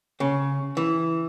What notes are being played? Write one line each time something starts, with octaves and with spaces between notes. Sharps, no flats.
C#3
E3